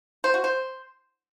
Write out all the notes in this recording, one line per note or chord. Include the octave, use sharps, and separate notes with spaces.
C5
F#4
C5